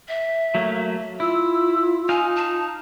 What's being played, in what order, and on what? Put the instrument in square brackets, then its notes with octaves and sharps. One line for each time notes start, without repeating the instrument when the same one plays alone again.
[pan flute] E5
[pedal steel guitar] F#3 A3 A#3
[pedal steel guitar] E4 [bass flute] F4 [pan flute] E6
[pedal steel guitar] D#4 F5 [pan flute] G#5
[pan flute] A5